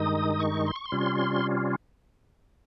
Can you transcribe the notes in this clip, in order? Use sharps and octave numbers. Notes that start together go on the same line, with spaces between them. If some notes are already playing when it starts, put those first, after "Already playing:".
Already playing: G2 D#3 G#3 D#4 D#6
C#6
C6
C#6
C6
C3 G3 C#4 F4